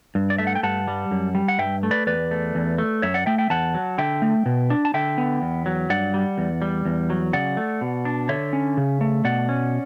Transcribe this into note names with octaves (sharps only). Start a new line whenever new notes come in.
G2
D5
A3 E5
F#5
G5
G2 F#5 A5
G3
F#2
G3
F#5
G2 E5 G5
A3
B4 D5
E2 B4 D5
A3
E2
A3
F#2 C#5 E5
D5 F#5
A3 E5 G5
E5 G5
E2 F#5 A5
F#3
D3 E5 G5
A3
B2
D4
A5
D3 E5 G5
B3
E2
F#3
G2 D5 F#5
G3
E2
G3
E2
F#3
C#3 D5 F#5
A3
B2
D4
D3 C#5 E5
C#4
C#3
A3
B2 D5 F#5
C#4